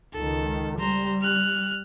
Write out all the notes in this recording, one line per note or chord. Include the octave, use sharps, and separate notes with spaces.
C#2 D#3 A4
G3 C5 A#5
F6 F#6